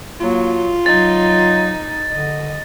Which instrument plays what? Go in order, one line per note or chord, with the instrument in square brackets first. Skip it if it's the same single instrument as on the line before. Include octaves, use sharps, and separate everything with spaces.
[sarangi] F#3 [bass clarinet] A#3 [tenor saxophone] F4
[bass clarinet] F#3 [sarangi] D#4 [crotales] A6
[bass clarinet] D3 [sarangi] D#5